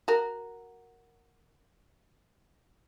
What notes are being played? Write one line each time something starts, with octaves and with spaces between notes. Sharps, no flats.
F#4 A#4